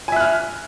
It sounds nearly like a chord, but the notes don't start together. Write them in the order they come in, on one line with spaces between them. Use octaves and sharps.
G#5 E5 F#6 F6